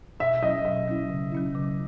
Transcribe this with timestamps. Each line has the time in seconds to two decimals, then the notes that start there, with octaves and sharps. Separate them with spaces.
0.20 B2 E5
0.43 F#3 C#4 E4 D#5
0.65 B2 E5
0.88 F#3 C#4 E4
1.10 C#3
1.32 F#3 C#4 E4
1.55 C#3